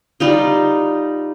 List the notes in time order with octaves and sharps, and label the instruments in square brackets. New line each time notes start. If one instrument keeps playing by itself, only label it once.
[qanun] G3 D#4 F4